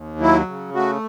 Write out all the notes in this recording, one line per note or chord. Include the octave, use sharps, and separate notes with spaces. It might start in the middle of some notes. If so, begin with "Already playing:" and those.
Already playing: D#2
F#3 E4
C#3
A3 F#4